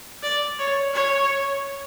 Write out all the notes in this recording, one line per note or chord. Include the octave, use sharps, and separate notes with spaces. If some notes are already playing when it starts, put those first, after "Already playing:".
D5
C#5
C#5